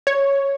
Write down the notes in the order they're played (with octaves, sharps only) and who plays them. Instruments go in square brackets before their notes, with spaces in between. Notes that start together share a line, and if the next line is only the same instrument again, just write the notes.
[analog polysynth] C#5